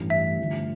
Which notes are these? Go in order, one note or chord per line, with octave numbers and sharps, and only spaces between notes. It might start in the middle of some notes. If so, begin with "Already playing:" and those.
Already playing: A1 G2 E3 A3
E5
G2 D3 F3 A3